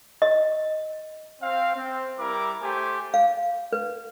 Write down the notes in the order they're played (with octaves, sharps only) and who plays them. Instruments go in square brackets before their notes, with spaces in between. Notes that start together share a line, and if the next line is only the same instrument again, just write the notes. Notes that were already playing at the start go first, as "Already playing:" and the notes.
[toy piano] D#5
[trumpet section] C4 F5
C4
G3 E4 A#4 D6
A3 G4 C5 G#5
[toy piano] F5
B4